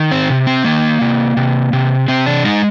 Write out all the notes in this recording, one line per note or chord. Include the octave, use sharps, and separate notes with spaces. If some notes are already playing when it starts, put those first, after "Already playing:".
Already playing: D#3
C4
C3
C4
D#3 A#3
C3
C3
C3
C3 C4
D4
G#3 D#4